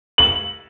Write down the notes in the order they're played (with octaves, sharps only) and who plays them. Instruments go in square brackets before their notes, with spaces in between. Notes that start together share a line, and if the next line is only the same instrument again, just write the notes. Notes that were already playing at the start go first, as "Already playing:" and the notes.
[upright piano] F#7